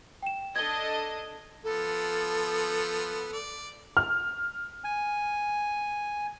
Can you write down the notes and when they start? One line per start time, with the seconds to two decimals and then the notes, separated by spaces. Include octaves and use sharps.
0.22 G5 E7
0.56 D4 A4 D#5 G#6 G7
1.64 F3 B3 A4
3.33 D5
3.97 F6
4.84 G#5